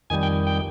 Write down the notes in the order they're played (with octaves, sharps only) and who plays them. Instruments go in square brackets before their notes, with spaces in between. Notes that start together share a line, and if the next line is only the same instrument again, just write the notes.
[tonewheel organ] F2 D#3 G3 G#5
G5
G5